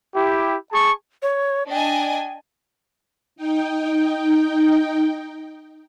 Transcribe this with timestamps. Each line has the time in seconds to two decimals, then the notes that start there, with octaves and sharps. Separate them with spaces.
0.15 E4 G4
0.72 G#4 A5 C#6
1.22 C#5
1.70 D4 D#5 G5 G#5
3.36 D#4 G5